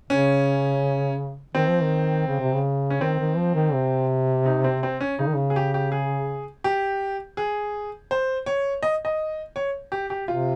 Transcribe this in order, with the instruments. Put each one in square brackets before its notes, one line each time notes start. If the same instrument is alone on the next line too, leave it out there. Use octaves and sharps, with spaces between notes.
[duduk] C#3 [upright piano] C#4
[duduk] D#3 [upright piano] C4
[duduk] F3
D#3
C#3
C3
C#3
[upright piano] C#4
[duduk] D#3 [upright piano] C4
[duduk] D#3
F3
D#3
C3
[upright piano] D#4
C4
C4
C#4
[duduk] C#3 [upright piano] D#4
[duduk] D#3
C#3
[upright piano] G#4
G4
G4
G#4
G4
G#4
C5
C#5
D#5
D#5
C#5
G4
G4
[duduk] C3 [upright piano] F4